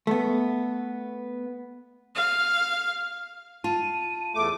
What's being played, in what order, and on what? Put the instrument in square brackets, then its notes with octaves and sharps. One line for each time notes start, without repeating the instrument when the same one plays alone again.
[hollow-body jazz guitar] A3 B3
[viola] F5
[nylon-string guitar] F4 [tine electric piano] A5 [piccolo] D#7
[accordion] E2 A3 D6